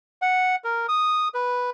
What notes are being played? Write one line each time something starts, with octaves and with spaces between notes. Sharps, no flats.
F#5
A#4
D#6
B4